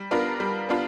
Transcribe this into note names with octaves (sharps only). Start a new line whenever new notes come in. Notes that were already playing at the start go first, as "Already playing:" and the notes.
Already playing: G3
B3 D4 F4 A#4
G3
B3 D4 F4